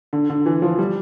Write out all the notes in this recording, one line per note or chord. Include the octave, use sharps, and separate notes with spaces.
D3
D3
E3
F3
G3